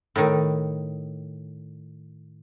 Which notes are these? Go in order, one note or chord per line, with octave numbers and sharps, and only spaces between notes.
A2 D#3